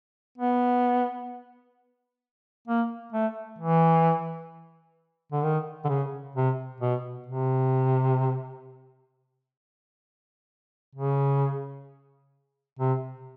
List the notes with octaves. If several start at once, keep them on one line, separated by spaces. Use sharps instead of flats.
B3
A#3
A3
E3
D3
D#3
D3
C#3
C3
B2
C3
C#3
C3